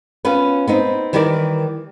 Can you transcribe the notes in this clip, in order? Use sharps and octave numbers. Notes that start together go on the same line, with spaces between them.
B3 C#4 F4 B4
B3 C4 D#4
D#3 E3 G3 A#4 C5 D5